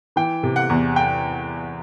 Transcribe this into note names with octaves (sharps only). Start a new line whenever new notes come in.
E3 G5
C3
F#5
E2
G5